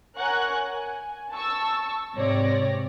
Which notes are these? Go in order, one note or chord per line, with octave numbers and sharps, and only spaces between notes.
A#4 C#5 F#5 G#5 C#6 F#6
G#5
A5 C#6 E6
G#2 C3 C4 C#5 D5 A#6